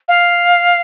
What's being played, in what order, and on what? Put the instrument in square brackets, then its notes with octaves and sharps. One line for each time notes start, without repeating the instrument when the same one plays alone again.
[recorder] F5